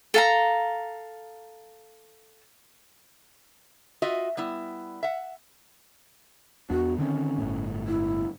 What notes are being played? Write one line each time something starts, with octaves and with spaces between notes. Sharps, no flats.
A4 F5 A#5
F4 F#4 D#5 E5
G3 B3 E4
E5 F#5
E2 B3 D4 F#4
D3 D#3 C4 C#4
G1 A2
E4